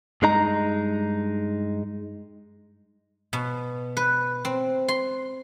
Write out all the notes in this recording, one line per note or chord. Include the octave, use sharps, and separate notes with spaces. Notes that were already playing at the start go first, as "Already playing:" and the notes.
G2 G#3 D#4 A#5
B2
B4
C4
C6